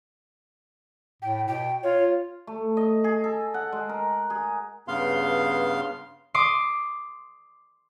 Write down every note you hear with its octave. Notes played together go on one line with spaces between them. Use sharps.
A2 G5
B2 G5
F4 C#5
A3
D#5
G#4
A4
F#5
G#3
A#4
G#4
G2 C#3 B3 F5 C6
C6 D6 D#6